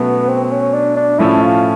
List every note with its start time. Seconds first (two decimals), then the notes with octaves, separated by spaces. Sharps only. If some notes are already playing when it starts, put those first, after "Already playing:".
Already playing: B2 F#3 A3 B3 C#4
0.28 C4
0.44 C4
0.52 C#4
0.74 D4
0.96 D4
1.19 A2 F3 A3 C#4 E4
1.41 F4